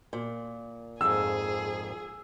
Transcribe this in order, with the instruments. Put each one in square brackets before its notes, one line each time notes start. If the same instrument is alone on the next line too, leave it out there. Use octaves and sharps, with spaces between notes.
[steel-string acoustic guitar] A#2
[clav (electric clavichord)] F2 G#2 [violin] G#4 [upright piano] E6